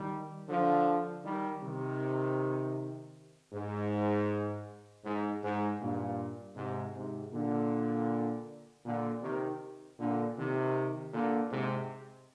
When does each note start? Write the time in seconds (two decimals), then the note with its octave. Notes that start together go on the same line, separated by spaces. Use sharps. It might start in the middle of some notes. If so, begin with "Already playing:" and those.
Already playing: D#3 G3
0.49 D3 F3
1.24 D#3 G3
1.63 C3 D#3
3.53 G#2
5.05 G#2
5.43 G#2
5.80 G2 A#2
6.56 G#2 C3
6.94 G#2 C3
7.32 A#2 D3
8.85 A#2 D3
9.23 C3 D#3
9.99 A#2 D3
10.37 C3 D#3
11.13 A#2 D3
11.50 G#2 C3